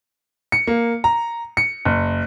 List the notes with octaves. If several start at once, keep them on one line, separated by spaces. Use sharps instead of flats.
C#7
A#3
A#5
C#7
F#1